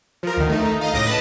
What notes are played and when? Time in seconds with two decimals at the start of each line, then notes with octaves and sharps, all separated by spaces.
0.23 F3 A#4
0.37 D2 D#3
0.49 A3 D#4
0.81 D#5 F5
0.93 C#2 A2 D#5 D6 D#6 A#6
1.06 B4 A5